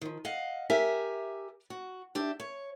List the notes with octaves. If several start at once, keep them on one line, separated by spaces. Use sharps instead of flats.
D#3 F3
D#5 F5 F#5
G4 A#4 E5 G#5
F#4
D4 G4 E5
C#5